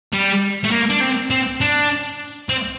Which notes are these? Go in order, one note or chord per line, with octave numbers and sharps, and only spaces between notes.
G3
A3
A#3
D4
C4
C4
D4
C4